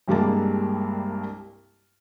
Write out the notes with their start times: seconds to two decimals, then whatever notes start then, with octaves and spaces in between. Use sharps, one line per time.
0.08 C2 G2 G3 G#3 A#3 A5